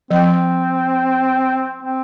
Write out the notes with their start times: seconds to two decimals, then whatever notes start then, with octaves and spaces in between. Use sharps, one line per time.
0.11 F3 C4
1.83 C4